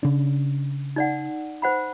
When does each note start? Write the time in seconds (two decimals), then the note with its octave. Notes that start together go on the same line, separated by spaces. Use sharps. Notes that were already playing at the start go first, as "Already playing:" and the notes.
0.03 C#3 D4
0.96 D#4 D5 F#5
1.62 C5 F#5 B5